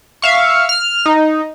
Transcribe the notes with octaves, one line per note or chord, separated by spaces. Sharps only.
E5 F5 C#6
F6
D#4